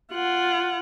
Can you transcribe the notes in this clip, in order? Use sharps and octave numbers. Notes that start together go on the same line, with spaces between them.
F4 F#5